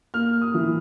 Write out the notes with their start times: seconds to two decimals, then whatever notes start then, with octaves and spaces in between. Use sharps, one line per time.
0.14 A#3 F6
0.41 D#6
0.54 E3